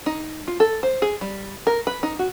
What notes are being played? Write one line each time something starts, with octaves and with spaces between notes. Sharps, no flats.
D#4
F4
A4
C5
G#4
G3
A#4
B4
D#4
F#4